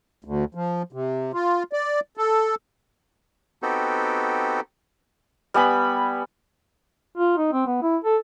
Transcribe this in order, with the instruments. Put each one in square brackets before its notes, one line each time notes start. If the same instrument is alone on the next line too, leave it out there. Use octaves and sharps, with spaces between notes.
[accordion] D2
F3
C3
F4
D5
A4
[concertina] B3 C4 D#4 F#4 G4 A4
[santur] G3 B3 G#5 B5
[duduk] F4
D#4
C4
B3
E4
A4